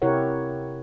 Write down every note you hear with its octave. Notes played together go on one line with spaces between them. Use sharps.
C3 E4 G4 A#4 C#5 F#5